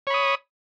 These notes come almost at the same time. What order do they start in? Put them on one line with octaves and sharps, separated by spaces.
C#5 B5 D#6